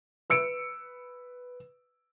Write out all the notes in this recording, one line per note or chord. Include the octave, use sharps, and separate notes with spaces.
B4 E6 C#7 D7